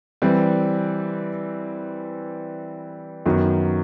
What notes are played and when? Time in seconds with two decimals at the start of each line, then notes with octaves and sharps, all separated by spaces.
0.22 E3 G3 C4
3.26 F#2 D#3 F#3 B3